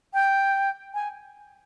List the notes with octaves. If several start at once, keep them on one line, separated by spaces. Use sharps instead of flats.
G5
G#5